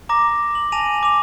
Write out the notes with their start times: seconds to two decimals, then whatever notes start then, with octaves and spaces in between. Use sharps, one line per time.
0.09 A#5 D6 A#6
0.55 F#7
0.72 G#5 A5 A#6 D#7 F7
1.03 D6 F7